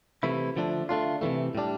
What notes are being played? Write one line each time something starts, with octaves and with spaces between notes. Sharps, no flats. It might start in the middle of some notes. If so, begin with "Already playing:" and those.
C3 E3 A3 E4
D3 F3 A3 D4
D3 A3 D4 F4
C3 E3 A3
A2 G3 D4